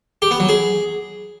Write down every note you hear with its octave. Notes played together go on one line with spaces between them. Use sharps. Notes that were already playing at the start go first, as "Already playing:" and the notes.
G4
B3
F#3
G#4